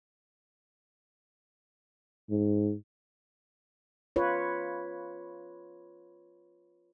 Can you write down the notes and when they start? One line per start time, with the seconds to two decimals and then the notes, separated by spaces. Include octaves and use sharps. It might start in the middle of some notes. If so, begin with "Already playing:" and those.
2.30 G#2
4.16 F4 B4 C#5